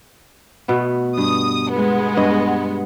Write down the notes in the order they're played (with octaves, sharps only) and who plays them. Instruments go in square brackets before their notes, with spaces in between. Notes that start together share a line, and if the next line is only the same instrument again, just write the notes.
[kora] B2 A3 B3
[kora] G2 [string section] D#6
[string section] G#3 B3
[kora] G2 D#5